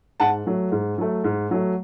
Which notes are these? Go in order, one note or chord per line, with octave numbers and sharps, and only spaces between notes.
G#2 F#5 A5
F#3 A3
G#2
F#3 A3
G#2
F#3 A3